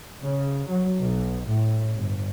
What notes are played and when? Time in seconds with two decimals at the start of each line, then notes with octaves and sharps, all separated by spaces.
0.21 C#3
0.68 F#3
1.01 B1
1.47 A2
1.95 G1